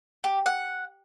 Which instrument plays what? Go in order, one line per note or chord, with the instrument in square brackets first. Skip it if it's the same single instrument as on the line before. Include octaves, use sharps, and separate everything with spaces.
[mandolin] G4
F#5